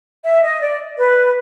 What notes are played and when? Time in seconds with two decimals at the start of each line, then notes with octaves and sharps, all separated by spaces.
0.25 E5
0.42 D#5
0.61 D5
0.97 B4